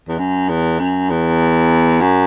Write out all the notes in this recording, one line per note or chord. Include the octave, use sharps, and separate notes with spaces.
E2
F#2
E2
F#2
E2
F#2